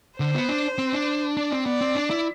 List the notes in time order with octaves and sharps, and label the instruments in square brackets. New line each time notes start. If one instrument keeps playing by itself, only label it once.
[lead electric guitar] D3 [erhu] C5
[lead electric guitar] B3
D4
C4
D4
[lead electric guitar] D4 [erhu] D5
[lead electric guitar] C4
[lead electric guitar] B3 [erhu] D5
[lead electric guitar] C4
D4
E4